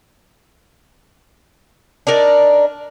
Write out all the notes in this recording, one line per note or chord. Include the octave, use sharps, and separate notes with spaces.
D4 D#4 A#4 D5